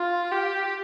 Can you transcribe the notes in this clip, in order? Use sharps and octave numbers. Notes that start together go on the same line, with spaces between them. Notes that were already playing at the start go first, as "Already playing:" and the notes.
Already playing: F4
G4